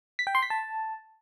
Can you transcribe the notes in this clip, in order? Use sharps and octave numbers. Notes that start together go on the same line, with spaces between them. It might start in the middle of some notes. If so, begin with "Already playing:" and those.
B6
G5
C6
B6
A5